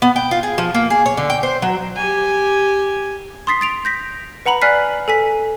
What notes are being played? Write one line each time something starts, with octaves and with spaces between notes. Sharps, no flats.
B3
G5
F4
G#4
F3
A#3
G#4
C#5
D3
G5
C5
F#3
G4 G#5
C6 D#6 A6 B6 C7
A6 D7 F7
G6 A#6 B6
B4 F#5 A#5 B5 F#7
D5 G#5 F6 F#6 B6 C7
A4 G#5 B6